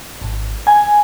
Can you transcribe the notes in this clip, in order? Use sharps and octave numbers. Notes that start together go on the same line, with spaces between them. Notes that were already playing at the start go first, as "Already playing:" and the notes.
G#1
G#5